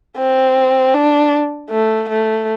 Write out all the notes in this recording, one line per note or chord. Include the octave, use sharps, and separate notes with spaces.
C4
D4
A3
A3